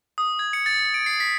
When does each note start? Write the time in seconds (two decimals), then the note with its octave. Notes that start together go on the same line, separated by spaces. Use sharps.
0.18 D#6
0.39 G#6
0.53 C#7
0.66 A6
0.94 D7
1.06 C7
1.20 B6